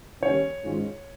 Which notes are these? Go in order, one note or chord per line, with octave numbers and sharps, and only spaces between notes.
D#2 C#3 G3 C#4 C#5
G#2 D#3 G#3 C#4 F4